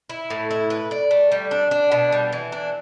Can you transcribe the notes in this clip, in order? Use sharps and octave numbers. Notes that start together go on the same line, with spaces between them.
E4
A2
E4
B4
D5
A3
G3
D4
D4
B2
G3
E3
D4